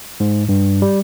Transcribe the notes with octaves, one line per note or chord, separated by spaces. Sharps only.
G#2
G2
G3